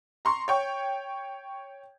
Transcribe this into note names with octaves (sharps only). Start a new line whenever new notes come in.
A#5 C6 C#6
C#5 G5 C#6